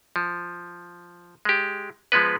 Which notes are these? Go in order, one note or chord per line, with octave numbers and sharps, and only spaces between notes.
F3
G#3 G4
F3 G#3 B3 B4